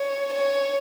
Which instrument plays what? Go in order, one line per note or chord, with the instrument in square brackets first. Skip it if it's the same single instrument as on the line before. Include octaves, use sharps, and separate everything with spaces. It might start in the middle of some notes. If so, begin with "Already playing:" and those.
Already playing: [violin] C#5
C#5